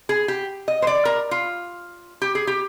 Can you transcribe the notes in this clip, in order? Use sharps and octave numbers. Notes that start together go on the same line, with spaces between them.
G#4
G4
D#5
C5
D5
A#4
F4
G4
G#4
G4